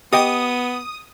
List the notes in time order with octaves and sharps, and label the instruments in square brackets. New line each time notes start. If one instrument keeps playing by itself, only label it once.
[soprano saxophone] B3 [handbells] G4 D#5 G5 [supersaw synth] D#6